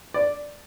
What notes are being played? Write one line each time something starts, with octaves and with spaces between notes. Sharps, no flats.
D5